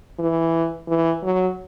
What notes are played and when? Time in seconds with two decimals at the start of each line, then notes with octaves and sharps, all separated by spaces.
0.19 E3
0.88 E3
1.23 F#3